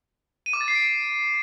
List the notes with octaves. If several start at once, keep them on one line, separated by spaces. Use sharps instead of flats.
D#7
D6
A6
C7
D7